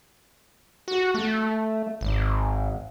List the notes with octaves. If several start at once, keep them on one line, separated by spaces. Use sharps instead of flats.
F#4
A3
G#1